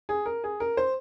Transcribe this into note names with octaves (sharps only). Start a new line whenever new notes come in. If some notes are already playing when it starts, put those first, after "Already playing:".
G#4
A#4
G#4
A#4
C5